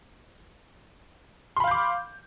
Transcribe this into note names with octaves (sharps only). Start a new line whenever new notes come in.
F5 B5 C6 D6 G6